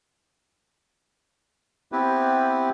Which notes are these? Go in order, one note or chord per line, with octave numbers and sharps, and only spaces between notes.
B3 C4 E4 G4 B4